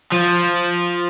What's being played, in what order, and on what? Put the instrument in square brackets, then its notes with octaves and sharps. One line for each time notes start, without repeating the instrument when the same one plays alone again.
[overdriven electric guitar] F3